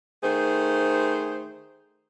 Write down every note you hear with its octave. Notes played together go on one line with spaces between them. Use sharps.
D#3 A3 G#4 C5